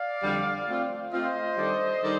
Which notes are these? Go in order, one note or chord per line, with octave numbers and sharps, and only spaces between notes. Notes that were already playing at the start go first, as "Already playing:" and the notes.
Already playing: D5 F5
F2 D3 G3
A3 C4 F4
A3 C4 F4 C5 D#5
D#3 G3 D4 A4 D5
D#3 G3 D4 A4 D5